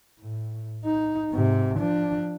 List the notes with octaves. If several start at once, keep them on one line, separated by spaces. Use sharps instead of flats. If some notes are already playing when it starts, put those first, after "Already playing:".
A2
D#4
G#2 C3
F3 D4